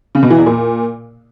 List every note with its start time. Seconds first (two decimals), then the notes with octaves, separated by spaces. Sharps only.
0.15 C#3
0.23 B2
0.31 E3
0.38 E2
0.46 A#2